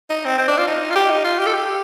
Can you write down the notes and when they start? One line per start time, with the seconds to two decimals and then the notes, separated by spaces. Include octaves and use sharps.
0.10 D#4
0.25 C4
0.38 C4
0.48 D4
0.58 F4
0.67 D#4
0.90 F4
0.96 G4
1.10 D#4
1.24 F4
1.39 G4
1.46 A4
1.53 G4